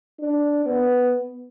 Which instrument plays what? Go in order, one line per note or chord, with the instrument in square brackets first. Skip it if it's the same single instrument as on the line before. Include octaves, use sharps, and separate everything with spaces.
[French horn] D4
B3